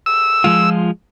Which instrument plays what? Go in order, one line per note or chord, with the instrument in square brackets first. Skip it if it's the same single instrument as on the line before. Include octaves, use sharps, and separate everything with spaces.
[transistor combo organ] E6
[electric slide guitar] F3 G#3 F4